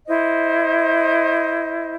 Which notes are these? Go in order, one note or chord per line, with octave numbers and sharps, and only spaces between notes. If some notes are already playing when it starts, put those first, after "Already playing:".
E4 C5 D#5